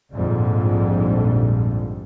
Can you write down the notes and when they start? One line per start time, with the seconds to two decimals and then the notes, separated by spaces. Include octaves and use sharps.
0.14 A#1 F2 G#2 D3 G3